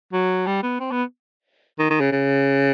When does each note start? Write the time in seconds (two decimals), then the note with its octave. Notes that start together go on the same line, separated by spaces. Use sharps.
0.13 F#3
0.47 G3
0.63 B3
0.80 C4
0.91 B3
1.79 D#3
1.90 D#3
2.01 C#3
2.12 C#3